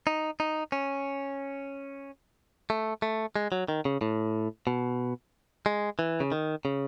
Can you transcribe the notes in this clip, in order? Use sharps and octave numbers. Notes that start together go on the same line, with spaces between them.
D#4
D#4
C#4
A3
A3
G#3
F#3
D#3
C#3
A2
B2
G#3
E3
C#3
D#3
C#3